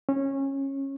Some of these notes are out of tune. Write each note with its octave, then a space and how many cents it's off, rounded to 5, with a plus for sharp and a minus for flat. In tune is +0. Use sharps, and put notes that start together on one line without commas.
C#4 -20